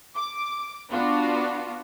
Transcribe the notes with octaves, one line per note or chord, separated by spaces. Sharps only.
D6
B3 D4 F4 F#4